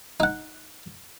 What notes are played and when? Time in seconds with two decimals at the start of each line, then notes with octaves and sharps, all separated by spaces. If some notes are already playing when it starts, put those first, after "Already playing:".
0.20 D#4 F#5